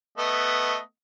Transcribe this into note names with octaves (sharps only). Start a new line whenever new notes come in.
A3 B3 D#5